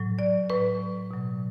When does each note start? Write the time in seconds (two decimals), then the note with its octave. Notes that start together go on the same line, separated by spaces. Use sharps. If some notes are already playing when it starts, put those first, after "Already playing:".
Already playing: A2 F#3
0.19 D5
0.50 A2 F#3 B4
1.11 B2 F#3